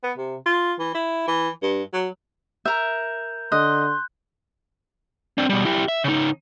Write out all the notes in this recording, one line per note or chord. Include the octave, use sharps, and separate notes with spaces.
B3
C3
F4
E3
E4
E3
G2
F#3
A#4 E5 G6
D3 D#5 C6 F#6
C4 D4
B2 G3
E4 G4
E5
C#3 D#4